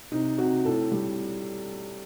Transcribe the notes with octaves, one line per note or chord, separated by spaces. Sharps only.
C3 D#4
C3 F#4
A2 A4
G3